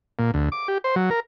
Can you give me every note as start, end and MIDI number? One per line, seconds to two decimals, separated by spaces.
0.19 0.31 46
0.34 0.49 38
0.52 0.68 86
0.68 0.78 67
0.84 0.95 72
0.96 1.10 54
1.10 1.20 70